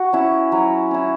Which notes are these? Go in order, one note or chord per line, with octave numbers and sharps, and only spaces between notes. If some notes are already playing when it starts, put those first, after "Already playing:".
Already playing: F#4
C#4 E4
F#3
C#4 E4